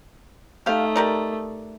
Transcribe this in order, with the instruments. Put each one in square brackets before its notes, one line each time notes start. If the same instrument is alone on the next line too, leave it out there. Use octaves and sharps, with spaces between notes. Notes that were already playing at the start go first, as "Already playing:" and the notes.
[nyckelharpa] A3 D#4 [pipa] G4 F5
[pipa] G4 A#4 D5